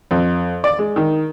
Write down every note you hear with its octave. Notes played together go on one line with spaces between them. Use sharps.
F2
D5
G#3
D#3